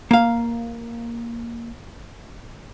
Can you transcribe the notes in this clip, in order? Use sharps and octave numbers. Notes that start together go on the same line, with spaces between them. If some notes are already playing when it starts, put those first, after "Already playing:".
A#3 F5